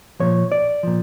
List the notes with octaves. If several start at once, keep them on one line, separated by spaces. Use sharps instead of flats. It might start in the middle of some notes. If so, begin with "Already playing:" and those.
A#2 F3 C#5
D5
A#2 F3